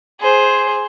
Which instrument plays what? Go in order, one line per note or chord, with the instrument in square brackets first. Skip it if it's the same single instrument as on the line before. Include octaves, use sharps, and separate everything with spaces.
[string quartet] G#4 C5